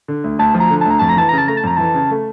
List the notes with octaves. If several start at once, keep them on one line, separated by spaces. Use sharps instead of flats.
D3
D2
D2 A5
F3
A#5
D3
A5
D2 A#5
F2 A5
A#5
E3 A5
C#3 A#5
A5
A3 A#5
A5
F2 A#5
E3 A5
C#3
A3